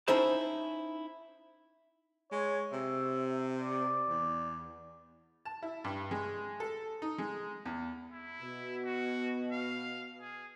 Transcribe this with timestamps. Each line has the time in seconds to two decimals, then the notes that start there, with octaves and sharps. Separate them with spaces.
0.08 C#4 D#4 E4 C5 A5
2.32 G#3 C#5
2.73 C3 E5
3.61 D5
4.09 E2
5.45 A5
5.62 E4
5.84 G2
6.11 G#3
6.60 A4
7.02 D#4
7.18 G#3
7.65 E2
8.12 E4
8.41 B2
8.85 F#4
9.52 F5
10.20 G#4